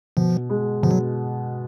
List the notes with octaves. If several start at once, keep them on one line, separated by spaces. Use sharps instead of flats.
B2 F3
G#3
B2 F3
F#3